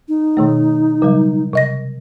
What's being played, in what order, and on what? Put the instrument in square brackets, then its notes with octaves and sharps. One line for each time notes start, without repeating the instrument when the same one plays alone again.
[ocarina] D#4
[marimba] B2 D#3 A3
C#3 F#3 G3
C3 D#5 A#6